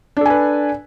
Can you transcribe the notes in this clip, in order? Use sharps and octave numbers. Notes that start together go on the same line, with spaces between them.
D4 A4 B4 G#5